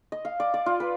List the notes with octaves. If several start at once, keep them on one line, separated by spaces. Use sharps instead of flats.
D#5
F5
D5
D5
F4
B4